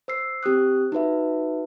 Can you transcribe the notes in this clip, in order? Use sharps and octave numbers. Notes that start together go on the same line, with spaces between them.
C5 E6 C7
C4 G4 C5 D#6 F#6
D#4 F#4 B4 E5